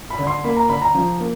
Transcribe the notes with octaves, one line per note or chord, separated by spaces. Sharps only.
B5
D3
C6
A#3 B5
A#5
D3 B5
A#5
F3
A#3